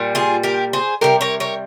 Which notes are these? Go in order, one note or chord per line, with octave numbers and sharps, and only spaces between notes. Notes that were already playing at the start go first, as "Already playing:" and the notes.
Already playing: A#2 G3
F4 G#4
G4 A#4
G#4 C5
C3 D#3 G3 G4 A#4
A#4 C#5
A#4 C#5